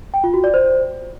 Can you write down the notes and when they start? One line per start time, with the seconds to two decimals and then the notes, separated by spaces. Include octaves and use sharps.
0.14 G5
0.24 F4
0.34 F#4
0.44 D5
0.54 C5